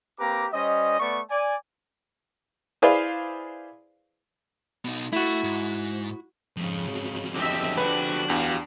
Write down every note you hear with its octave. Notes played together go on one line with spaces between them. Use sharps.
A#3 C4 G4 B4 A#5 D6
G3 C#4 C5 D#5
A3 B3 D5 C#6
D5 G#5
E4 G#4 B4 C5 D5 F5
B2 D#4
A3 E4 F#4
G#2
F2 G#2 C#3
F2 F#3
E2 D3 F3 G4 D#5 E5
D4 F#4 B4
E2 G4 F5